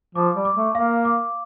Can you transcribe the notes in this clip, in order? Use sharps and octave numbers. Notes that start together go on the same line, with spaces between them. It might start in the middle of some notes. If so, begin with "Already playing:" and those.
F3 D6
G3
D6
A3
A#3 F5
D6